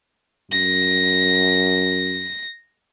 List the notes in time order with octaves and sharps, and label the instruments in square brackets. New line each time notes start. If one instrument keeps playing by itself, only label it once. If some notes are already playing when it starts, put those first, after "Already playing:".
[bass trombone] F#2 [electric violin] A#6